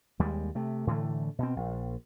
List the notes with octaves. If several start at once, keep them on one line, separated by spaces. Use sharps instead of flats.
D#2 G3 G#3
C3 A3
A2 D3 E3 A3
B2 C4
A#1